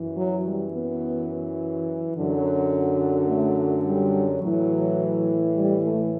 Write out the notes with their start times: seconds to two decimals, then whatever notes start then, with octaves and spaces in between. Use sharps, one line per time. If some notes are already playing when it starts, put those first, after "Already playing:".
Already playing: F#2 E3
0.17 F#3
0.45 G3
0.73 B3
2.15 F#2 D3 F#3
3.28 A3
3.56 A3
3.84 G3
4.41 A2 E3 F#3
5.54 G3
5.82 A3